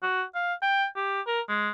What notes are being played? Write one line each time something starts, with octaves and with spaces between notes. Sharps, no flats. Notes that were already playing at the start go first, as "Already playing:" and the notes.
F#4
F5
G5
G4
A#4
G#3